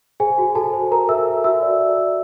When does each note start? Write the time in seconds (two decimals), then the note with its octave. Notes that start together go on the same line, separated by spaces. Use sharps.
0.20 G#4 C5 G#5
0.38 F#4
0.55 F#4 A4 A5
0.73 C5
0.91 A4 A#4 A#5
1.09 A4 E5 E6
1.27 A4
1.44 F#4 E5 E6
1.62 D5
1.80 D5
1.97 D5